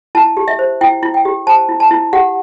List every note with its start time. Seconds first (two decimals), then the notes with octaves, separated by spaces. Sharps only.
0.15 E4 A5
0.37 G4
0.48 E5
0.59 C5
0.81 E4 G5
1.03 E4
1.14 G5
1.25 G4
1.47 C5 A5
1.69 E4
1.80 A5
1.91 E4
2.13 G4 F#5